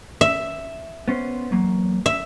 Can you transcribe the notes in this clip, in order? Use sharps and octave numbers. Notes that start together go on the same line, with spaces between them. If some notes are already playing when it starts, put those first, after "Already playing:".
E5
B3 C#4 C5
E2 F#3 A#3
E5